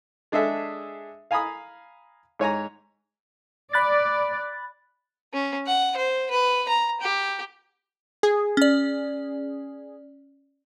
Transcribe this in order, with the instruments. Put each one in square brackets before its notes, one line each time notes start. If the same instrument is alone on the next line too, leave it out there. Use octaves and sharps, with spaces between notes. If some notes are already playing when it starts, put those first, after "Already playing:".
[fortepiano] G#3 D4 G#4 A4 E5
F5 G#5 A#5 B5 D#6
G#2 C#5 G#5 A#5
[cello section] D5 [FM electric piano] B5 F#6 A6
[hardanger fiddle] C#4
F#5
C5
B4
A#5
G4
[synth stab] G#4
[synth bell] C#4 D5